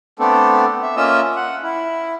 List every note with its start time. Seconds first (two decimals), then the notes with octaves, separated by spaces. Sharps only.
0.19 A3 B3 C4 D4 A4
0.83 E5
0.97 A#3 C#4 F4 D#5 E5 E6
1.36 F#5
1.64 E4